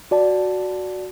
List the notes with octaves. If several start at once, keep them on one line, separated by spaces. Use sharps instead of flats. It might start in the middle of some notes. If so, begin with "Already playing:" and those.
F#4 D5 A5